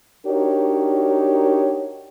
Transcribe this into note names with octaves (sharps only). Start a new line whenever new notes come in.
D4 D#4 F#4 G4 A#4 C#5